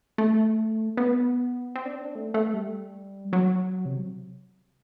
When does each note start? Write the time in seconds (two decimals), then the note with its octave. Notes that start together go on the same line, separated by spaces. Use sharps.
0.18 A3
0.97 B3
1.75 C4
1.85 D4
1.95 C4
2.05 D4
2.15 A3
2.34 A3
2.54 G3
3.33 F#3
3.85 C3